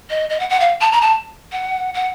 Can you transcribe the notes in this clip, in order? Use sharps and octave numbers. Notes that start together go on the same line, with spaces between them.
D#5
D#5
F#5
F#5
F5
A5
A#5
A5
F#5
F#5